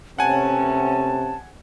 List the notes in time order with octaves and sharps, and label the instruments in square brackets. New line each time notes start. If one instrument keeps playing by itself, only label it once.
[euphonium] C3 [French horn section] A3 B3 C#4 [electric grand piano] F#5 G#5 [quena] A5